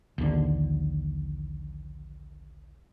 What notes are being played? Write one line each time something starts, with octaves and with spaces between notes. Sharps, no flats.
A#1 D#2 D3